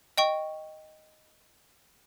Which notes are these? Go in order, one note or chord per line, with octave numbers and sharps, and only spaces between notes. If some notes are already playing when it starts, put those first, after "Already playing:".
D#5 G5 C#6